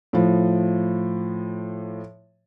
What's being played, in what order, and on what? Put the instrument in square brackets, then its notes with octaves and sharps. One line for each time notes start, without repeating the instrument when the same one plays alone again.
[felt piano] A2 F3